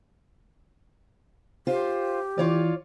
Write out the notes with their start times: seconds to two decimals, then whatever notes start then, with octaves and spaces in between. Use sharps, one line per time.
1.67 F4 G4 C5
2.38 E3 F4 C#5 D5